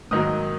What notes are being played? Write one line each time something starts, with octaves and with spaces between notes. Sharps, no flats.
G#2 D#3 F#3 A#3 D#6